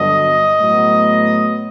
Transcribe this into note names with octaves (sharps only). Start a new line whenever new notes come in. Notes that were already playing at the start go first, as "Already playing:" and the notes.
Already playing: G2 D3 F#3 B3 D#5
A2 F#3 B3